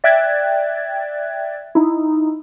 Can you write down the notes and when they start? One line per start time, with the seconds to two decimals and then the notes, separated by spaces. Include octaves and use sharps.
0.04 D5 E5 G5 F#6 G#6 A6
1.75 D#4 E4